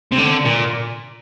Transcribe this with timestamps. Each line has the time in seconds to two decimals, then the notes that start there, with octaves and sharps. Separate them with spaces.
0.12 C3
0.18 D3
0.45 A#2